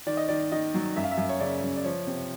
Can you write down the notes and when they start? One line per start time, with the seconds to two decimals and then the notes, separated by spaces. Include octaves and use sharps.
0.07 D#3 D5
0.17 D#5
0.28 D#3 D5
0.52 D#3 D#5
0.74 F#3
0.96 F#2 E5
1.04 F5
1.11 E5
1.18 F#2
1.29 C#5
1.40 C#3 D5
1.63 F#2
1.76 D5
1.84 F3 C#5
2.07 C3